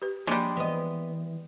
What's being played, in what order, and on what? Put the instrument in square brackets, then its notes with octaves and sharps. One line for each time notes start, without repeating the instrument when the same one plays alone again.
[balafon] G4 B4
[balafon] F3 A#3 [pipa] G3 G#3 [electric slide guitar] D4 G4 G#4
[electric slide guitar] E3 [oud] B3 D#5